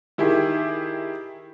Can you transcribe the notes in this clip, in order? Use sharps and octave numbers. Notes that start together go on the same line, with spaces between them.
D#3 E4 G4 G#4